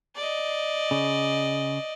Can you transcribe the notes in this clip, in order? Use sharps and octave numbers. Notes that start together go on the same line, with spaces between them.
D5 D#5
C#3